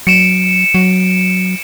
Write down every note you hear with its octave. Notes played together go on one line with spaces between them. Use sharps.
F#3 C#7 D7 E7
F#3